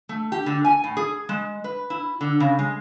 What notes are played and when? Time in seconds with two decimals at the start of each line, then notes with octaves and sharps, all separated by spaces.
0.09 A3
0.32 G4
0.46 D3
0.65 G#5
0.84 A2
0.97 G#4
1.29 G#3
1.64 B4
1.90 E4
2.21 D3
2.40 C#3
2.59 G#3